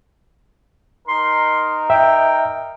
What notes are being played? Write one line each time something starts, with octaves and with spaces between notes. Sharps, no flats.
D#4 A#4 C6
E5 G5